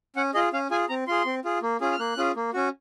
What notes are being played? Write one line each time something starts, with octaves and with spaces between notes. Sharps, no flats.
C#4 F#5
F4 G#4 D#5
C#4 F5
F4 G#4 G#5
C4 A#5
F4 G#4 C6
C4
F4 G#4
A#3
C#4 F4 G#4
F6
A#3 F#6
C#4 F4 G#4
A#3
C#4 F#4